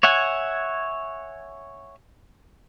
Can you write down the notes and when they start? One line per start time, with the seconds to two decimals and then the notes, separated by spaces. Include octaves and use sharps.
0.03 C#5 E5 F#5 G#5